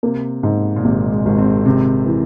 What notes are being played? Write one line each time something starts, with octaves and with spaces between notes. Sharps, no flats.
C3 A#3
G#2
A#2
G#1 C3
G#3
G#1
C4
C3 C4
E3